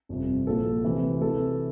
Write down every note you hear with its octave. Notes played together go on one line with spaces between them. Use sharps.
G1 F2 C3
A#1 A#2 A4
D2 C3 E3
D2 C3 E3 A4